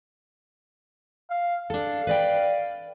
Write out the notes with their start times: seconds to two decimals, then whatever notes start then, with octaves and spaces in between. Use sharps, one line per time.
1.30 F5
1.70 D4 A4 F5
2.07 B4 D5 G5